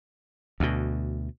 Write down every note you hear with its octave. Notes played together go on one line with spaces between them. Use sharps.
D2 B2